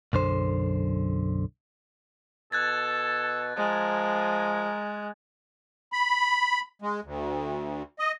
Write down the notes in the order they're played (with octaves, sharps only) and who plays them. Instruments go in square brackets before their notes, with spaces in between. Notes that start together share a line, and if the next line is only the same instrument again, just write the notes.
[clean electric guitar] B1 F#2 D3 C5
[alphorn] B2 [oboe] A4 [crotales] F#6 G#6 A6
[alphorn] F3 [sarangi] G#3 [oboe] A#4
[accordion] B5
G#3
D2
D#5